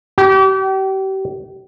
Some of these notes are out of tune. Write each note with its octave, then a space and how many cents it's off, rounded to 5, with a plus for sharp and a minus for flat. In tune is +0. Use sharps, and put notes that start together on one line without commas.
G4 -35